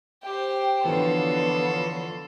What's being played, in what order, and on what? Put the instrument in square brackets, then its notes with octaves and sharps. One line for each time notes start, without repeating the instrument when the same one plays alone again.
[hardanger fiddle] G4 C5 [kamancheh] G5
[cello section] D3 F4 C#5 [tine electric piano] E3 F3 [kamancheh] B3 [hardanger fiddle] A4